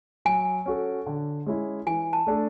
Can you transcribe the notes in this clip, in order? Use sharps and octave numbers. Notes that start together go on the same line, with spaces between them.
F#3 G#5
C#4 F#4 A4
D3
G#3 C#4 E4
E3 G#5
A5
A3 D4 A4